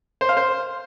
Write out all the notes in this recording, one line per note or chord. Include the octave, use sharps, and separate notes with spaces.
C5
F5
C5